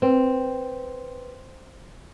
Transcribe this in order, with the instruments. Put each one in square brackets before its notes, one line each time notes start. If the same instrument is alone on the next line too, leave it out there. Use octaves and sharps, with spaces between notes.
[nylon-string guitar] C4 [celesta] B4